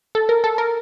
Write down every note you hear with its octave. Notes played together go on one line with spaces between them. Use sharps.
A4
A#4
A4
A#4